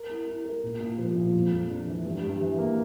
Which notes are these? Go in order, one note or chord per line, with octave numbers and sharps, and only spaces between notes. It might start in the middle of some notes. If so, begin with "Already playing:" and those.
Already playing: A#4
E4
E4
A#4
A#2
A#2
F3
A#2
F2
F2
D4
E3
G2
G2
E3
A#3